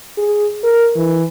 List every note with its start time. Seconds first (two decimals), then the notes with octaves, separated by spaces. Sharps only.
0.18 G#4
0.63 A#4
0.96 E3